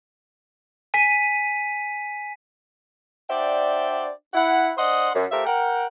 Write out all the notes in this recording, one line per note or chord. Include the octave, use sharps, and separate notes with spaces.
G#5 B6 D#7
D4 F#4 C5 D5 E5 G5
E4 F#5
D4 C5 D#5 F#5 C6 D#6
F#2
A3 F4 G4 A#4 C5 E5
A#4 F#5 G5